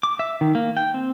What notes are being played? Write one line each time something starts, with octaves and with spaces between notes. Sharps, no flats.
D6
E5
D#3
A#3
G5
C4